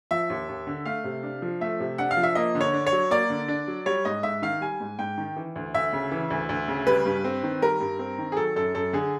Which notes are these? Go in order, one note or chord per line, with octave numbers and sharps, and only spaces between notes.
F3 E5
D#2
D#2
D3
A3 F5
C3
D4
F3
A3 E5
C3
D4 F#5
F5
F3
E5
A#3 D#5
D3
C#5
D4
C#5
F#3
A#3 D5
D3
D4
F#3
G3 C#5
G#2 D#5
G#2 E5
D#3 F5
G3 G#5
G#2
G#2 G5
D#3
E3
D2
D2 E5
C#3
E3
D2
D2
C#3
G3 B4
G2
C4
D#3
G3 A#4
G2
C4
D#3
G#4
F#3 A4
F#2 A4
F#2 A4
D3 G#4